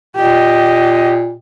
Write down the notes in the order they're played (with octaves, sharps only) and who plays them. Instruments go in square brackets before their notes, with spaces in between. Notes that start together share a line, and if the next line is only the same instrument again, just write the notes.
[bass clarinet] A#2 [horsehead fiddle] G4 D#5